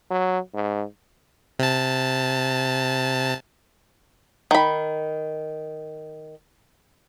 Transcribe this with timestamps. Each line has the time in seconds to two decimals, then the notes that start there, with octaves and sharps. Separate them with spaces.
0.10 F#3
0.54 G#2
1.59 C3 A5
4.51 D#3 B5